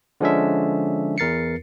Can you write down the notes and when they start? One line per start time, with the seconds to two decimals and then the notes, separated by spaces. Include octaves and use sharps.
0.21 D3 F3 G#3 C#4 D4 E5
1.18 E2 A#4 A6 C7 C#7